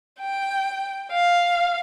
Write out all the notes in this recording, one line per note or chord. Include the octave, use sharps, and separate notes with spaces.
G5
F5